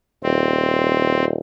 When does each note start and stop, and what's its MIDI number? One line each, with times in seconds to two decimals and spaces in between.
0.23 1.39 27
0.23 1.25 60